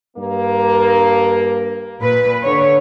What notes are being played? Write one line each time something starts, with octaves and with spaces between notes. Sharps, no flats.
G2 A#3
A#2 B4
D3 C#5